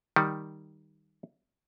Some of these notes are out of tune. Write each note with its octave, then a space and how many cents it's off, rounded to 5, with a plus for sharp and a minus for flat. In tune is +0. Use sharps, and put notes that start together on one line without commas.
D#3 +0 G3 +0